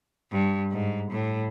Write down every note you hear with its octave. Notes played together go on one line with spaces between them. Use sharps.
G2
G#2
A2